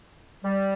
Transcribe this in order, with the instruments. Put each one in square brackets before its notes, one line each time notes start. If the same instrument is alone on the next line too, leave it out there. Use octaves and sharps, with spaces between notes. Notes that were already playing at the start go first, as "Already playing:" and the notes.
[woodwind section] G3